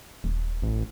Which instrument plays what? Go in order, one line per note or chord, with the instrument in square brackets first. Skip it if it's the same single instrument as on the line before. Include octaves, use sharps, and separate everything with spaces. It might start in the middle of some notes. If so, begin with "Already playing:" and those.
[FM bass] D#1
[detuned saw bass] A1